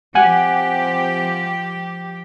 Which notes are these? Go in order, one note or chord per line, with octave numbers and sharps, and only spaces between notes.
F3 C4 G4 F#5 G#5 F#6